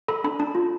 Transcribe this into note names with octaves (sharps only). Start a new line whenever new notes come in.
A4 B5
D4 B5
D4 A5
F4